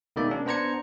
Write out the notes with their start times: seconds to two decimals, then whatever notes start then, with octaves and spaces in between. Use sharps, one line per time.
0.16 B2 D#3 G#3 A#3 D5 E5
0.31 C#4 D4
0.46 B3 D4 C5 A#5 G#6 C#7